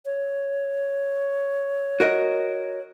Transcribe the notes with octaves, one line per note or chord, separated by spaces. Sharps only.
C#5
F#4 A#4 D#5